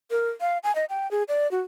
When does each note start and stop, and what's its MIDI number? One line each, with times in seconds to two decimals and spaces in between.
0.11 0.29 70
0.41 0.58 77
0.64 0.74 80
0.75 0.85 75
0.90 1.10 79
1.11 1.23 68
1.28 1.50 74
1.51 1.60 66